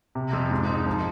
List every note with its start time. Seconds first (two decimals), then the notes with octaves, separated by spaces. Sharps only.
0.15 C3
0.33 F2
0.51 G#2
0.69 D#4
0.87 F3